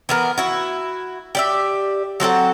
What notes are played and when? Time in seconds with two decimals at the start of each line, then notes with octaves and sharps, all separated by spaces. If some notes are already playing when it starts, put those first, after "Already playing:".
0.09 E3 B3 A#4
0.38 E4 F#4
1.35 G4 D5 E5
2.20 F#3 C4 A4 F#5